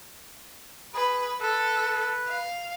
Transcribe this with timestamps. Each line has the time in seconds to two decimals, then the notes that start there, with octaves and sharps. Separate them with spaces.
0.94 G#4 B4
1.41 A4 B4
2.28 F5